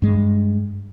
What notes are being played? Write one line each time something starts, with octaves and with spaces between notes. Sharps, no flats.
G2 G#3